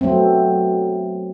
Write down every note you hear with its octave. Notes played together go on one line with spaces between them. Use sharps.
F#3 A3 B3 C4